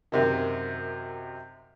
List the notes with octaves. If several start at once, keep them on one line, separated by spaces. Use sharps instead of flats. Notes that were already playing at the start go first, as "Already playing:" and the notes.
F#2 C3 D#3